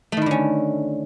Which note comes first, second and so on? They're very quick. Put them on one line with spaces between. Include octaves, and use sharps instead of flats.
A3 D#3 E4 D3 C#4